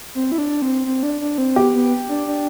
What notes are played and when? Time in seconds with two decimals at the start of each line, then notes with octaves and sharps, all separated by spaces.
0.15 C4
0.32 E4
0.38 D4
0.62 C4
0.86 C4
1.03 D4
1.21 D4
1.38 C4
1.56 B3 G4
1.74 B3
2.09 D4
2.27 D4